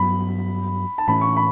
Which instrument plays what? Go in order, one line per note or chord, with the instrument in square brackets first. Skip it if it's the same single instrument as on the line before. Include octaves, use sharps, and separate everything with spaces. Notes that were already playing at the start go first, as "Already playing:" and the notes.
Already playing: [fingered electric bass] G2 F#3 B3 [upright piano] B5
[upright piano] A5
[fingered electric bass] A2 E3 A3 C#4 [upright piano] B5
[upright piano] C#6
B5